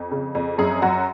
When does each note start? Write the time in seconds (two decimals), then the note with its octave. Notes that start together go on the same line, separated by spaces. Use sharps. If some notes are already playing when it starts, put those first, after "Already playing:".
Already playing: F2
0.11 C#3
0.35 F2
0.58 F#2 G#4
0.82 F#2 F#4